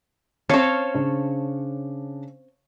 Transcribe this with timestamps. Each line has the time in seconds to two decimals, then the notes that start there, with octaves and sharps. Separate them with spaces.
0.49 C4 C#4 C#5 F5 A5
0.94 C#3 D4